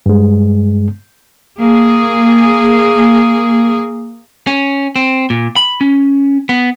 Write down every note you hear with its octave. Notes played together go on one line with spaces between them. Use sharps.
G2 G#3
A#3 G#4
C#4
C4
A#2
B5
C#4
B3